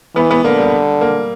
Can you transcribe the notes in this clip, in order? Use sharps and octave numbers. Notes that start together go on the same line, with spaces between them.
E3 B3
B3
D3 A#3
G3
A#3